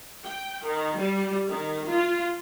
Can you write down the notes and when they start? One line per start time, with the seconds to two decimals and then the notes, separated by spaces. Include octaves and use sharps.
0.24 G5
0.65 D#3
0.97 G3
1.48 D#3
1.88 F4